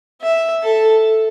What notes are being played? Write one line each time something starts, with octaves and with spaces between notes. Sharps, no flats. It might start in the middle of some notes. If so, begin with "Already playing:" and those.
E5
A4